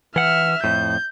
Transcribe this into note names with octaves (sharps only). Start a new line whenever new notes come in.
E3 E5 F#5 F6
F2 A2 G6